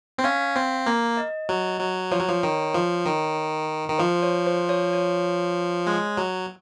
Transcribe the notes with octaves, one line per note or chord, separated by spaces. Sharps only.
C4
C#4 F5
C4
A#3
D#5
F#3
F#3
F3 C#5
F#3
F3
D#3
F3
D#3
D#3
F3 C5
C#5
C5
C#5
C#5
G#3
F#3